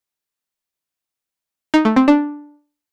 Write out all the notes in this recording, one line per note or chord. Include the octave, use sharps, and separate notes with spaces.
D#4
A3
C4
D4